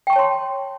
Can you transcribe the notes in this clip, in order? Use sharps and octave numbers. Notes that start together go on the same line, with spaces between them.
C#5 G5 A5 C6 C#6